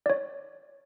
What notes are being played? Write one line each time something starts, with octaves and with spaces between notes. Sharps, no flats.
C#5 D5